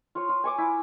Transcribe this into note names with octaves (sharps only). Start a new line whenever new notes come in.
F4 C5 C#5
F4
G#5 C#6 D6
E4